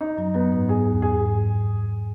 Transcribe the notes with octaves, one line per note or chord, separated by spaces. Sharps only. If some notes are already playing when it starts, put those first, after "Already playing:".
D#4
F#2 F#3
F#2 F#3 B3
G#2
F#2 G#4
E2
F#2 G#4
G#2